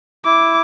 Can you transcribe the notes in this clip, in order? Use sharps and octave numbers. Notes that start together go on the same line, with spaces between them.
E4 D6